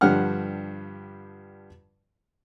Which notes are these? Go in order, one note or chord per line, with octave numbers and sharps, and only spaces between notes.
G2 D3 F3 G3 F#5 F6